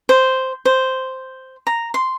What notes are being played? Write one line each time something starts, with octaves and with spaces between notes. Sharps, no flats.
C5
C5
A#5
C6